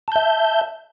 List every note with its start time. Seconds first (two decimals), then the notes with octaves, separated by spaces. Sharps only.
0.08 A5
0.12 G6
0.16 E5